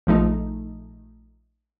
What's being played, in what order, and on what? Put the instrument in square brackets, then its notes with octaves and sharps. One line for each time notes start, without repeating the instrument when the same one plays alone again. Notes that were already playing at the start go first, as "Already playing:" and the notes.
[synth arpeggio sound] A#1 F3 A3 D#4